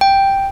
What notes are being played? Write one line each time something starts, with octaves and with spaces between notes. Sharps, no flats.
G5